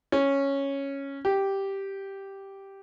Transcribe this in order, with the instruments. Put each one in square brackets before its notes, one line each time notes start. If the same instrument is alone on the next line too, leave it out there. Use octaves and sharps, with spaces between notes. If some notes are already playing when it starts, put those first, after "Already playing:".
[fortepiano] C#4
G4